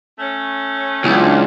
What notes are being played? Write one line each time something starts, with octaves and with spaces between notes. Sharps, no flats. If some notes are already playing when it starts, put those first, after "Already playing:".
A3 C#4
C#2 E3 F#3 B3 D4 F4